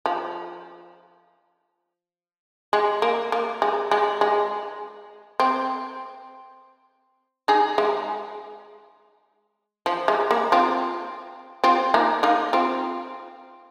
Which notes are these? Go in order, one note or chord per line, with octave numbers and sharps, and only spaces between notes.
F3
G#3
A#3
A#3
G#3
G#3
G#3
C4
D#4 G#4
G#3
F3
G#3
A#3
C4 F4
C4 F4
A#3 D#4
A#3 D#4
C4 F4